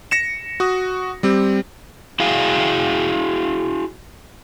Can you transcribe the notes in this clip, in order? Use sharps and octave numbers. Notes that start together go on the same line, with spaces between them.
A#6 C#7 E7
F#4 D#6
G3 C4 G4
E4 F#4 G#4 F5